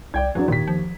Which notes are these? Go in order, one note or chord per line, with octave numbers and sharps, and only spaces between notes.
C2 D5 G5 G#6
E2 E3 F#3 D4
D#2 A#2 B6
F3